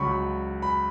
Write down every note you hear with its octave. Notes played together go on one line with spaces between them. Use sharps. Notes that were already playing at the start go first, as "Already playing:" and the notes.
Already playing: C#2 C#3 F#3 B5 C#6
B5